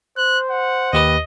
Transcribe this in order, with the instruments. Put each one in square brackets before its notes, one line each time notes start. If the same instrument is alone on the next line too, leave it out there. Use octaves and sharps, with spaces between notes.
[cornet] C5 [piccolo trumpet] F#6
[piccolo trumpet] F#5
[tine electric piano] D#2 G4 B4 [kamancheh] D#5